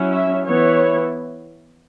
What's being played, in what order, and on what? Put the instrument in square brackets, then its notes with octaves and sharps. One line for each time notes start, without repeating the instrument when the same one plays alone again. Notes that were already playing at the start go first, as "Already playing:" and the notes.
Already playing: [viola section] F#3 C#4 E4
E5
E3 B3 E4 C#5